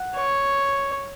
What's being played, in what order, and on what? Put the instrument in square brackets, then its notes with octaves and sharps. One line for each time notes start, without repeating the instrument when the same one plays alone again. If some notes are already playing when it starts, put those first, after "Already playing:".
Already playing: [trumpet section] F#5
[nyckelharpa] C#5